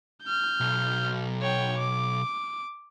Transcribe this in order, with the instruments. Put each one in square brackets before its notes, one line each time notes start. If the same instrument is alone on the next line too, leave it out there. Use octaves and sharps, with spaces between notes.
[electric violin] F6 G6
[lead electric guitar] B1
[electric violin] C#5 G5
D6